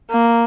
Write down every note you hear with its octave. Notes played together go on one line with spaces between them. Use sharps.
A#3